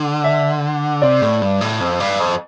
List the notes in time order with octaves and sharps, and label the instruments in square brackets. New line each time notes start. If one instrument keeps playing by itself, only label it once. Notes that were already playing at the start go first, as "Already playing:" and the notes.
Already playing: [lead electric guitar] D3
[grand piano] E5
[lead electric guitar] C3 [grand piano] D5
[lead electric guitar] A2
G2
A2
F2
G2
F2